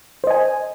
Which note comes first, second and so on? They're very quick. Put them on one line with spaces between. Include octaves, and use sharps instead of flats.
C5 D#5 G#5